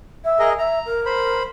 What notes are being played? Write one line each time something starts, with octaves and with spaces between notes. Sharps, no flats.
E5
G#4 A#4 D#5
E5 A#5
A#4
C5 B5